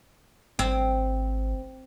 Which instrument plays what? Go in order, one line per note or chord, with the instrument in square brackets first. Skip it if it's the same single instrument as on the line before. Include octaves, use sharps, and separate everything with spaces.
[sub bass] G#1 [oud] C4